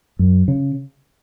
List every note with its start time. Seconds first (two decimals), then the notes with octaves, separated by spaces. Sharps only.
0.19 F#2
0.48 C#3